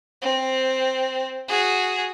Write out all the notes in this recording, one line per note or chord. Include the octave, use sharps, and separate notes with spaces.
C4
F#4 G#4